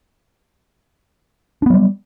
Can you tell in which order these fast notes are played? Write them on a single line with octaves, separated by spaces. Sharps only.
D4 B3 F#3 G3